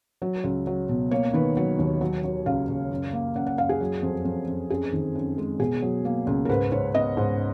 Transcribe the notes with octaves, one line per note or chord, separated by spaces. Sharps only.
F#3
C#2
F#3
B2
A#3 C#5
D#3 B4
F#3 C#5
D#2
F#3
F#3
C#2 F5
C#2
F#2
A#3
F#2 F#5
F#5
F#2 F5
G#4
F#3
F2
F2
F2
F#2 G#4
D#3
F#2
G#3
B2 G#4
F#3
A#3
C#2
A#4
G#2 B4
G#2 C#5
B3 D#5
G#2